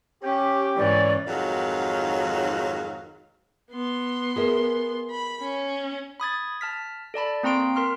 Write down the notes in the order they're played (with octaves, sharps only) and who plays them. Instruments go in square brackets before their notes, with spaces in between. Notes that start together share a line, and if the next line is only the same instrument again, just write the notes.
[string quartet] C#4 [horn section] G4
[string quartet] G#2 E3 C#4 [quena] D5
[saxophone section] F2 G#2 D#3 F#3 F#4 F5
[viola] B3 C6
[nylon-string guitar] G#4 A#4 E5
[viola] B5
C#4
[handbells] B5 D#6 G#6 A6
A5 F6 B6
A4 D5 A5 B5
A#3 C4 A#5 C6 D7
A#4 C6 F6